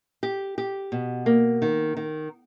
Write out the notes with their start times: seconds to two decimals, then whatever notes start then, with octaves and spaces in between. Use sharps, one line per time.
0.23 G4
0.58 G4
0.92 B2
1.26 A#3
1.62 D#3
1.97 D#3